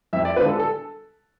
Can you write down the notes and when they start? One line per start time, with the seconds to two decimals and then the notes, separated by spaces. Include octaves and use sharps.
0.13 F2 E5
0.25 D5
0.36 D3 G#3 D4 F4 B4
0.48 A4
0.60 A4